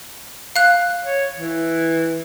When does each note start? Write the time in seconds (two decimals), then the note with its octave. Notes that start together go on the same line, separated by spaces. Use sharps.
0.56 F5 F#6
1.04 C#5
1.36 E3